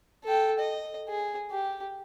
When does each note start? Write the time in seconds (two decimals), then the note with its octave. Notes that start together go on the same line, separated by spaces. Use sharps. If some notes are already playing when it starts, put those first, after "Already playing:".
0.24 A4 G5
0.59 D#5
1.09 G#4
1.51 G4